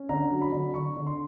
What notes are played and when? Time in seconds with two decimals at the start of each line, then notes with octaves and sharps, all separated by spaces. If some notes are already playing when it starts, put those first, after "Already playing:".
Already playing: C#4
0.09 D3 A#5
0.31 F#3
0.42 B5
0.53 D3
0.74 D3 C#6
0.97 D3
1.06 C6